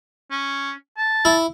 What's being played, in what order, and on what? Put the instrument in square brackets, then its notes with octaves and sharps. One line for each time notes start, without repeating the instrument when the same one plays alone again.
[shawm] C#4
A5
[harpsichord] E4